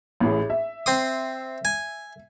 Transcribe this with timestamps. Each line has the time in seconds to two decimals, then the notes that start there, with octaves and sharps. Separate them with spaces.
0.20 A1 A2 G#4
0.50 E5
0.86 C4 C6 D#6
1.65 G#5